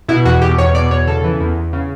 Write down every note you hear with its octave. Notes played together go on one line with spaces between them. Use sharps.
B2 E4
E2 F#4
B2 G4
E2 C#5
B2 D5
E2 C#5
C#3 A4
E3
E2
E2
C#3